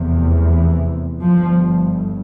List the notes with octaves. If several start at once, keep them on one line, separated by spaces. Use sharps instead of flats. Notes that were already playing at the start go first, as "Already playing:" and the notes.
Already playing: F1 E2 C3
E3
G1 G2 F3